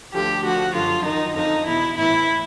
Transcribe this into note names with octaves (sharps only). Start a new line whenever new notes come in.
D2 D3 F3 G4
D2 D3 F3 F#4
F#2 D3 F3 F4
F#2 D#3 D#4
F2 D3 F3 D#4
E2 B2 E4
A2 E3 E4